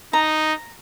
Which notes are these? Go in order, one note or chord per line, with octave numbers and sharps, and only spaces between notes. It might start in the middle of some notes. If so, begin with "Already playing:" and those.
D#4 A#5